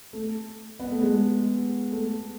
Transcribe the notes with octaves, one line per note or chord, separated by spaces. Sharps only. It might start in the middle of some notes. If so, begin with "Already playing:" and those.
A3
B3
A3
G#3
A3